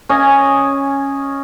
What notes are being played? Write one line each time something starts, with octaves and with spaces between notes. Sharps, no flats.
C#4 D#5 G#5